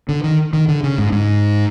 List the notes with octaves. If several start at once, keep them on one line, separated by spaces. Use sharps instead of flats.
D3
D#3
D#3
D3
C#3
G#2
G#2